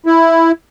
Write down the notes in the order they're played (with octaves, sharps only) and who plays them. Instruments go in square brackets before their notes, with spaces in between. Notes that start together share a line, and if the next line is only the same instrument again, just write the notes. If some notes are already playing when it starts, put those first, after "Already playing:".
[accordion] E4